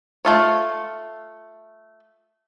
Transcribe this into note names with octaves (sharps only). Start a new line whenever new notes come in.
A3 F4 C#5